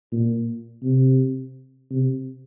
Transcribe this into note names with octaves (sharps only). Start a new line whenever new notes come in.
A#2
C3
C3